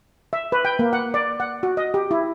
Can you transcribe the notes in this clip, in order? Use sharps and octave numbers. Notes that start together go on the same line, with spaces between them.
E5
B4
G5
A#3
F#5
D5
F#5
F#4
D#5
G4
E4